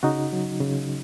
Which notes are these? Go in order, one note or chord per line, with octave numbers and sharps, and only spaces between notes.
C#3 D#4 F#4
F#3
C#3